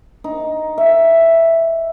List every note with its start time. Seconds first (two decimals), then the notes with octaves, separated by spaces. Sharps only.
0.24 D#4
0.78 E5